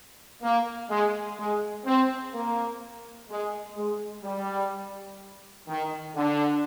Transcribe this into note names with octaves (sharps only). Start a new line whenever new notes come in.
A#3
G#3
G#3
C4
A#3
G#3
G#3
G3
D#3
D3